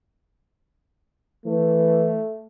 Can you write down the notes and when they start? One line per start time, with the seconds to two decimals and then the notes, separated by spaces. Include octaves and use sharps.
1.45 E3 A3